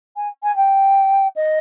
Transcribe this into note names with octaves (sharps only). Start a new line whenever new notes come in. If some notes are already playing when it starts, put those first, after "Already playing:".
G#5
G#5
G5
D#5